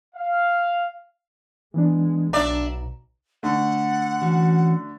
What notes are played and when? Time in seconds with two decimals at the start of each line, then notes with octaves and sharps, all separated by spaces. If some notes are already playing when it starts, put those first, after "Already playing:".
0.15 F5
1.74 E3 G#3 B3 D4
2.33 B1 D4 D5 E5 A#5
3.43 D3 A3 F#5
4.22 E3 C#4 F#4